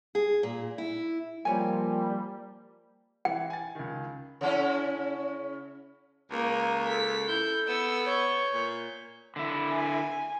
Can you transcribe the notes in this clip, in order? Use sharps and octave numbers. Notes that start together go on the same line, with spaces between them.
G#4
A#2
E4
F3 G3 A#3 C4 G4 C#5 G5 G#5
E3 G5
G#5 A6
C#2 D#3
C#3 C#4 E4
C#2 A#3 G#5
A4 B6
E4 G6
B3 E6
C#5 C#6 G6
A#2
D3 E4
G#5